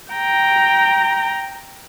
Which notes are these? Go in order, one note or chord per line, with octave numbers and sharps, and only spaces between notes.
G5 A#5